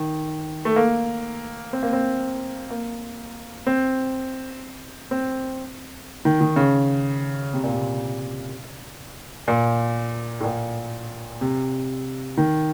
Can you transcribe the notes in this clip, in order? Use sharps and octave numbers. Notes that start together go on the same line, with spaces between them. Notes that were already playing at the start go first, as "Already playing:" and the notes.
Already playing: D#3
A3
A#3
C4
A#3
C4
A#3
C4
C4
D#3
D#3
C#3
C3
A#2
C3
A#2
A2
A#2
C3
D#3